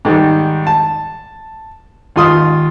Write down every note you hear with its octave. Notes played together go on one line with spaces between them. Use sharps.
G#2 D#3 G3
A5
D#2 G#2 F4 C6 D#6 F6